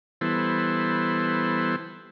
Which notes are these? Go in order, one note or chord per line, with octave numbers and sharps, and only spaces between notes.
E3 G3 B3 E4 A4 C5